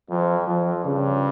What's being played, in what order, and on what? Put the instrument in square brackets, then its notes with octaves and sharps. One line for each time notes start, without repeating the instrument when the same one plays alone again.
[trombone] F2 [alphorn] F3
[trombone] F2 [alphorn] F3
[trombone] G2 [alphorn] C#3